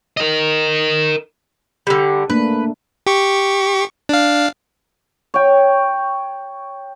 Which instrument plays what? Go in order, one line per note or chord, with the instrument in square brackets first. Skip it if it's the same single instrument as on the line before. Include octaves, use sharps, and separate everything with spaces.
[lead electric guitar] A#4 D#5
[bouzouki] D3 G3
[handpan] A3 A#3 D4 [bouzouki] B4
[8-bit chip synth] G4 C#6
D4 F5
[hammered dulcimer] C#5 G5